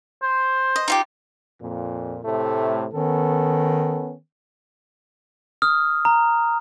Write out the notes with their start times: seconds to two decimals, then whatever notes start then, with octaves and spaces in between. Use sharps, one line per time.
0.22 C5
0.76 D#5
0.88 D#4 F4 G4
1.61 F2 A#2
2.24 A2 C3 A3
2.94 D#3 B3 C#4 A4
5.62 D#6 F6
6.05 A#5